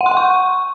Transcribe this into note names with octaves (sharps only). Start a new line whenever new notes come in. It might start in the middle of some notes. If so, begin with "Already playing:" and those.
F#5
C6
F#5
C#6